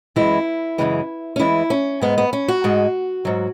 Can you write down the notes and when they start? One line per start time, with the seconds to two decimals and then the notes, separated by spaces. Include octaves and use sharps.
0.16 F#2 E3 G#3 E4
0.78 F#2 C#3 E3 G#3
1.36 C#4
1.39 E2 E3 G#3 E4
1.70 C#4
2.01 G#2 G#3 B3
2.18 B3
2.33 C#4
2.48 F#4
2.64 G#2 G#3
3.25 G#2 F#3